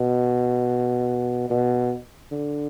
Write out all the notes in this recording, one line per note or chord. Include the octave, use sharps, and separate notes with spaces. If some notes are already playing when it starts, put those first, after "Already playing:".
Already playing: B2
B2
D3